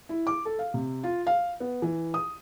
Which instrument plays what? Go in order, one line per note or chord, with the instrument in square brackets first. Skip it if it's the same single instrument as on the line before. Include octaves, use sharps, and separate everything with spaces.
[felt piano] E4
D6
A4
F5
C3
F4
F5
B3
E3
D#6